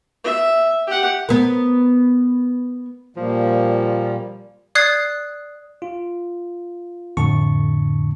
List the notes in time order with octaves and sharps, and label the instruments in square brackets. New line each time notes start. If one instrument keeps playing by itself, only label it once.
[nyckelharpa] E5
G4 F#5
[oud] B3 A#4
[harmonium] A#2 G3 A#3 [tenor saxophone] F3
[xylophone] D5 D#6 F#6 G#6 C7
[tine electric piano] F4
F2 A2 D3 A3 A5 C#6